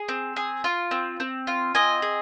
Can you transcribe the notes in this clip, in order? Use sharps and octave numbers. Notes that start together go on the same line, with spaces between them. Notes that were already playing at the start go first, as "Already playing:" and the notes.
Already playing: G#4
C4
G#4
F4
C4
C4
F4
C4 D#5 G#5
G#4